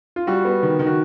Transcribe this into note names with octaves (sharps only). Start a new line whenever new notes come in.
F4
G3 F#4
B3
D#3
D#3
F#4